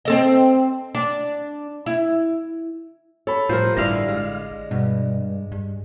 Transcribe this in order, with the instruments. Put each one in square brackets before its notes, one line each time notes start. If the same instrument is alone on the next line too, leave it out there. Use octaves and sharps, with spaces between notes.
[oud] C4 A4 D#5
D4
E4
[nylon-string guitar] A4 [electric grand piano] C#5 B5
[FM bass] A2 [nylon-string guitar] F3 G3 A#4 [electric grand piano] F4 [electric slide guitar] C5
[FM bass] A1 [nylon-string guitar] G2 E4 [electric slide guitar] D3 F5 [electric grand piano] D5 A#6
[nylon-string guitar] G#3
[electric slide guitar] G2 [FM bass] B2
[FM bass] G2